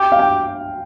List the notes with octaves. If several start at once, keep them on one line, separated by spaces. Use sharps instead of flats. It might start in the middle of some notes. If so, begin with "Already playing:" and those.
Already playing: G4 G5
F5
G5